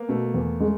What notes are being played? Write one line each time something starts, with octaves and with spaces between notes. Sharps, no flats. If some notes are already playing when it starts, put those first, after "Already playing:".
Already playing: A#3 B3
B2 A3
E2
G#3